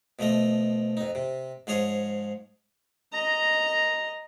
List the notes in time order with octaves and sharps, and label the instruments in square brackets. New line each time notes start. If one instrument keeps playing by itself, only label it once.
[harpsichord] B2 F3 A3 D#5
F2 D#4
C3
G#2 F3 G#4 C#5 D#6
[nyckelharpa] D#5 A#5